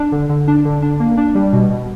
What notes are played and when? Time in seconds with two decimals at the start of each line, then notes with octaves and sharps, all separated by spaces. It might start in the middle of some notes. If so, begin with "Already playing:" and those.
Already playing: D4
0.12 D3
0.29 D3
0.48 D4
0.65 D3
0.82 D4
1.00 A#3
1.17 D4
1.35 G3
1.53 B2
1.70 B2